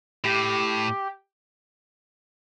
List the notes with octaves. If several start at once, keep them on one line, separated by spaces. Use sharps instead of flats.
A2 G4